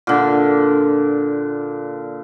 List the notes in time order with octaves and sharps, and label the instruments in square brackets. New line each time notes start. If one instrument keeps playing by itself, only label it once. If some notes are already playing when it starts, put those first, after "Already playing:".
[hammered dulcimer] A#2 D3